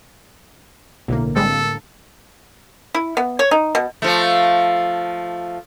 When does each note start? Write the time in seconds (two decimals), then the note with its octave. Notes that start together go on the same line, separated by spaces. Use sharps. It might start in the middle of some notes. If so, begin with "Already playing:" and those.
1.08 B1 A2 D3 A#3
1.36 G3 G#3 C4 A4
2.94 E4
3.17 B3
3.39 C#5
3.51 D#4
3.75 B2
4.02 F3 A3